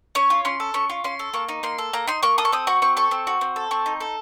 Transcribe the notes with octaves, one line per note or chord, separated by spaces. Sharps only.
C#4 C#5
F4
C#4 C6
A4
C#4 C#6
F4
C#4 C6
A4
A#3 C#6
D#4
A#3 C6
A4
A#3 A#5
D#4 C6
A#3 C#6
A4 D#6
C#6
C4 D#6
F#4 C#6
C4 C#6
A4 C#6
C4
F#4
C4
A4
C4 C#6
D#4
A4